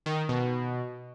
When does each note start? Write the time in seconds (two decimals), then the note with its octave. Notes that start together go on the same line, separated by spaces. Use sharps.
0.06 D#3
0.29 B2